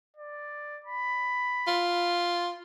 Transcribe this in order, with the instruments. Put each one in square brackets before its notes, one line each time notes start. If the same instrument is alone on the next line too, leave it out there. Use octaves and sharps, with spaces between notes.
[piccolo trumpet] D5
B5
[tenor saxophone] F4